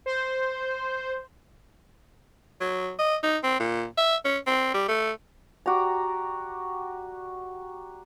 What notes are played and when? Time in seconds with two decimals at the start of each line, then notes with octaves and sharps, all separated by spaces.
0.06 C5
2.61 F#3
2.99 D#5
3.23 D#4
3.43 C4
3.59 A#2
3.97 E5
4.25 C#4
4.47 C4
4.74 G3
4.88 A3
5.66 F#4 G4 D5 A#5